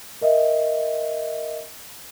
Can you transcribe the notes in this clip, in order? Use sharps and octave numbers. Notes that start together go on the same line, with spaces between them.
A#4 D#5 E5